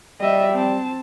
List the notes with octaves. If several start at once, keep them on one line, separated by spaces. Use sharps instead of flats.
G3 D#5 E5
C4 A5